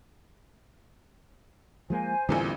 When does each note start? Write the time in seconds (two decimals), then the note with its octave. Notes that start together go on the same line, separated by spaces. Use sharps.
1.90 F3 G#3 A#3 C5 G#5
2.29 A1 E2 A#2 D3 G3 C4